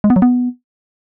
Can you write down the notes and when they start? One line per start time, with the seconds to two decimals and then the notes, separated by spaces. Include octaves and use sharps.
0.04 G#3
0.10 B3
0.16 F#3
0.22 B3